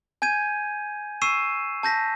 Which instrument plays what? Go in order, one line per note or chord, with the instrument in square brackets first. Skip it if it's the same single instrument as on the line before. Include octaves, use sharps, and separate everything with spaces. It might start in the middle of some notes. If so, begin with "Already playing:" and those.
[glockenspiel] G#5 G6 G#6 D#7
C#6 E6 C7 D#7 E7
A5 G6 A#6 B6